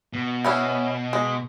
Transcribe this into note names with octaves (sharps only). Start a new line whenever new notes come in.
B2
B3 C#4 E4
G#3